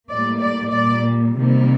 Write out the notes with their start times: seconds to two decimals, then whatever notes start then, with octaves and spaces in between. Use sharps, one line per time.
0.10 A2 G3 A#3 D5
0.42 D5
0.74 A#2 G3 A#3 D5
1.39 C3 D#3 G3 A#3